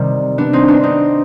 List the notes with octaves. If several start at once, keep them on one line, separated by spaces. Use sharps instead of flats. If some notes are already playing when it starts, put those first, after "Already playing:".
Already playing: C3 D#3 G3
B3 D4
C4 D#4
B3 D4
C4 D#4